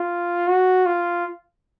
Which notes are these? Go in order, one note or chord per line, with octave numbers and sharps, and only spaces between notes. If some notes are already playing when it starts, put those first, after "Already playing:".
Already playing: F4
F#4
F4